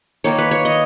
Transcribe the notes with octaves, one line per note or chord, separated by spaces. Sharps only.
D#3 A#3 C#5
B4
C#5
D#5